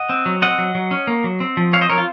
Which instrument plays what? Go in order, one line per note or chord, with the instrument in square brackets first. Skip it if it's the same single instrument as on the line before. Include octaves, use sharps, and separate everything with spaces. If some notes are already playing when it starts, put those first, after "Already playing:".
Already playing: [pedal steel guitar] D#5 F#5
C4
F#3
C4 D#5 F#5
F#3
F#3
C#4
A#3
F#3
C4
F3
C4 C#5 F5
C5 D#5
F3 A#4 C#5
F4